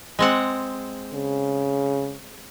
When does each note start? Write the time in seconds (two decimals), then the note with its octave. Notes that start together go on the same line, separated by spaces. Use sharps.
0.19 G#3 C4 F#5
1.14 C#3